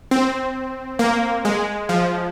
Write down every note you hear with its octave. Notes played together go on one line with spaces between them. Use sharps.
C4
A#3
G#3
F3